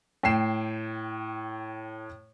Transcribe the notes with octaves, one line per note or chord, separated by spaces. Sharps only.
A2 G5 C7 E7